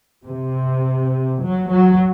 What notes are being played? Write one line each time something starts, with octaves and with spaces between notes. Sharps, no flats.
C3
F#3
F#3